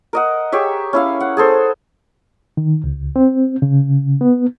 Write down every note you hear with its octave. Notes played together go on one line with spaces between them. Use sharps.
A#4 D#5 F#5
G4 G#4 C#5 E5
C#4 E4 F5
F#5
G#4 A4 C5
D#3
C#2
C4
C#3
B3